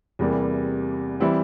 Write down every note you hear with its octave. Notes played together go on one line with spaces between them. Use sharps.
E2 C3 E3 G3 A#3
E3 G3 C4 E4